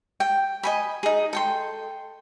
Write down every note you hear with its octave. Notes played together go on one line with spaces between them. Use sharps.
G5
D#5 G#5 B5
D#4 G#4
A4 G5 C6